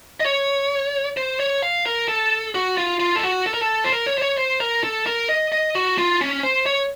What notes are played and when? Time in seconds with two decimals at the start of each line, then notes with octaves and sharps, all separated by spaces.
0.20 D#5
0.25 C#5
1.17 C5
1.40 C#5
1.62 F5
1.86 A#4
2.08 A4
2.55 F#4
2.78 F4
3.00 F4
3.16 A4
3.23 F#4
3.46 A4
3.54 A#4
3.62 A4
3.84 C5
3.92 A#4
4.06 C#5
4.18 C5
4.22 C#5
4.37 C5
4.60 A#4
4.84 A4
5.06 A#4
5.29 D#5
5.52 D#5
5.75 F#4
5.98 F4
6.21 C#4
6.43 C5
6.66 C#5